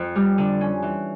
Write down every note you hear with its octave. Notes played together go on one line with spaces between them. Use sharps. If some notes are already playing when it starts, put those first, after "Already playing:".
Already playing: F2
G3
D3
C#4
E3